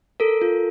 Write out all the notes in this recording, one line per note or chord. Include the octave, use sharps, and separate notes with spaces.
A4 A#4
F4